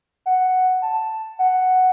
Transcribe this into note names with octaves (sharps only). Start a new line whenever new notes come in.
F#5
A5
F#5